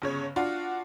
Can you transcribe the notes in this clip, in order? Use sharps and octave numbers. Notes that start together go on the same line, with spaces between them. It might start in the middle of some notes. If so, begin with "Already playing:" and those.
G1 C#3 C#5
D4 F4 F#4